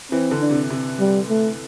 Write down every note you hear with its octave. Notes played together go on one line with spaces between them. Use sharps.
E3 C4
D3
D4
C3
C3
G3
A3